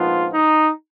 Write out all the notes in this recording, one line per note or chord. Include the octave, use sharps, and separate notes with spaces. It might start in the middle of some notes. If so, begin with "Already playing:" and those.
Already playing: A#1 G#2 F3 B3 F4
D#4